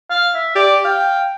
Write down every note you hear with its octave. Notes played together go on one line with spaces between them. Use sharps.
F5
E5
G4 D5
F5 G5